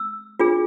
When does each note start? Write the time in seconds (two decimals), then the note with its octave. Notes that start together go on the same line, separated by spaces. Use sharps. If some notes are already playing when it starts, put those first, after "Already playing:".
Already playing: E6
0.40 D4 F4 G#4